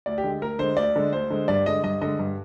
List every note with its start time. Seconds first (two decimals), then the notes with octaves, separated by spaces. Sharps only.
0.06 D2 D5
0.18 G4
0.23 D3 G#3
0.42 D2 A#4
0.59 D3 G#3 C5
0.77 D2 D5
0.96 D3 G#3
1.12 D2 C5
1.30 D3 G#3
1.48 G2 D5
1.66 D3 G#3 D#5
1.83 G2 D#5
2.01 D3 G#3 D#5
2.19 G2